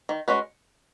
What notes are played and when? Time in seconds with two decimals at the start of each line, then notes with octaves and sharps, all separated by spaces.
0.09 D#3
0.28 G#3 C#4 F#4 B4